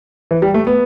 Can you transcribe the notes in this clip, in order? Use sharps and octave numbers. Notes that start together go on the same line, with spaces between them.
E3
G3
A3
B3